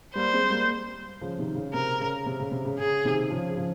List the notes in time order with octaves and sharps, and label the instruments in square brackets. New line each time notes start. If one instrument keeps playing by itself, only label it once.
[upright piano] G3 A#3 [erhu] C5
[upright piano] G#3 C4
G3 A#3
C#3 F3
C3 D#3
C#3
[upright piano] C3 [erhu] A#4
[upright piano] C#3
C3
C#3
C3
C#3
[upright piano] C#3 [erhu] G#4
[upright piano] C3 D#3
C#3 F3
C#3 F3